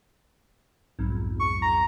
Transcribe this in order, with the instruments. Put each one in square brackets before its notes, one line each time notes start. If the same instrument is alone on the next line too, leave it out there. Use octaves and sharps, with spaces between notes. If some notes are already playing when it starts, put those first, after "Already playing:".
[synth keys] B1 F2 G#2
[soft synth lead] C#6
A#5